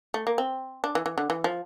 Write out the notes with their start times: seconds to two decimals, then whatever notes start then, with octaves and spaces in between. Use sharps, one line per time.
0.14 A3
0.27 A#3
0.38 C4
0.84 D4
0.95 E3
1.06 E3
1.18 D3
1.30 E3
1.44 F3